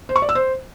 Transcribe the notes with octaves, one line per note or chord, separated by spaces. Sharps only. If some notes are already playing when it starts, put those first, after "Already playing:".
C5
C#6
D5
E6
C5